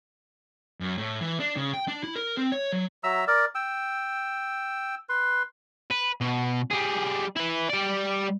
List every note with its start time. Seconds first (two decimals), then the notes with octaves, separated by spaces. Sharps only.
0.81 F#2
0.98 A2
1.21 E3
1.40 D4
1.56 C#3
1.74 G5
1.88 D4
2.03 E4
2.16 A#4
2.37 C4
2.52 C#5
2.72 F#3
3.04 F#3 E5 A#5 E6
3.28 A#4 D5
3.55 G5 E6
5.09 B4 C6
5.91 B4
6.21 B2
6.71 G3 G#4
7.36 E4 B4
7.70 G3 D5